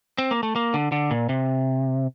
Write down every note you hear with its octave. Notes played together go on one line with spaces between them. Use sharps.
C4
A#3
A3
A#3
D3
D3
A#2
C3